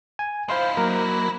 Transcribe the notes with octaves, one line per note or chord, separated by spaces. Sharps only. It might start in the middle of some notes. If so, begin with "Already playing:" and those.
G#5
D#4 E4 C5 F5 C6
F#3 A#3 A#4